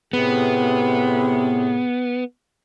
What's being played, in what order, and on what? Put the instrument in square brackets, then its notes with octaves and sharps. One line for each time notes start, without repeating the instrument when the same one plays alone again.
[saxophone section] A2 C3 G#4 [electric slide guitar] B3